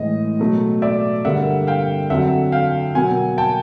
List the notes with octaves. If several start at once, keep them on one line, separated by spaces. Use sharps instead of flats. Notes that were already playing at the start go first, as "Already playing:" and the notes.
Already playing: A2 E3 G#3 D#5
B2 F#3 A3
D5 E5
G2 D3 G3 A#3 E5 F#5
F5 G5
F2 D3 F#3 E5 F#5
F5 G5
B2 F#3 A#3 F#5 G#5
G5 A5